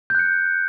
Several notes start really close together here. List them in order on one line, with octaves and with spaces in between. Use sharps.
G6 F#6 C#7